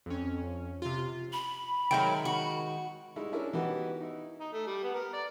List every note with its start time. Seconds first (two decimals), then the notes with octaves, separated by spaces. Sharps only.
0.06 F2 C#4
0.82 C3 F4
1.33 B5
1.91 D#3 F#3 G#3 A3 A#4 G5 G6
2.25 F#4
3.16 G3 G#3 D#4 E4
3.32 C#4 D4 E4 G#4 A#4
3.53 E3 B3 D#4 F#4 G4 B4
4.01 D#4 E4
4.41 D#4
4.53 A3
4.67 G3
4.83 B3
4.94 A#4
5.13 D5